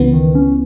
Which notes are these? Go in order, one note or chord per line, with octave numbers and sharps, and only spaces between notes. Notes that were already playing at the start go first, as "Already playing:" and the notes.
Already playing: C#2 C#3 E3 B3
D#3
C#4